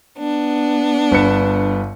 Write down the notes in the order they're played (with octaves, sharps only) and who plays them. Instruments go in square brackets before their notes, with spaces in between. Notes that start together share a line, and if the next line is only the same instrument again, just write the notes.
[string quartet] B3 D4
[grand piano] G1 B4 C#7